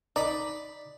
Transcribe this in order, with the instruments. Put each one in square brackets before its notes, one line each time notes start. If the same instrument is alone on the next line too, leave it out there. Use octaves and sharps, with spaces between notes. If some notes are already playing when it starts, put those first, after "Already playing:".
[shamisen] D#4 [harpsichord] D5 B5